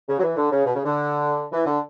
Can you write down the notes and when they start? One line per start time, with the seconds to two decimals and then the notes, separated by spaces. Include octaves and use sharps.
0.09 C#3
0.18 F#3
0.23 E3
0.36 D3
0.52 C#3
0.66 B2
0.75 C#3
0.85 D3
1.52 E3
1.66 D3